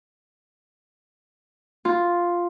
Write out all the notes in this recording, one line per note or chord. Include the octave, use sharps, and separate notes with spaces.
F4